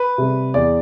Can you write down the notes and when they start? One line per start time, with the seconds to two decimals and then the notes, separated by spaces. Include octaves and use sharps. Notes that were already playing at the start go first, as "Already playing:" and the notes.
Already playing: B4
0.18 C3 G3
0.54 E2 D5